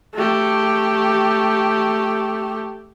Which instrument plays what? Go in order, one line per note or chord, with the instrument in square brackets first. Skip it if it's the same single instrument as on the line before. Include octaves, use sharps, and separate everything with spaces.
[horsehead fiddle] A3 G4